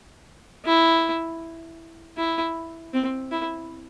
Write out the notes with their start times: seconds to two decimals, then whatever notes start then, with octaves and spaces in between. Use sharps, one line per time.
0.66 E4
2.17 E4
2.93 C4
3.32 E4